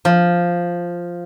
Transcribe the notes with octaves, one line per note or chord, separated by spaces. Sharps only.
F3